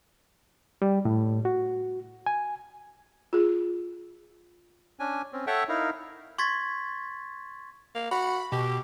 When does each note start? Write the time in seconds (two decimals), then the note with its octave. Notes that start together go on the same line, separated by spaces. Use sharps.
0.82 G3
1.05 A2
1.45 F#4
2.26 G#5
3.33 F4 G#4
5.00 C#4 D4 G#5
5.33 C4 C#4
5.47 A4 C#5 E5 F#5 G5 C#6
5.69 D#4 E4 A#4 F5
6.38 C6 C#6 G#6 A6 B6
7.95 A#3
8.11 F#4 B5
8.52 B2 G4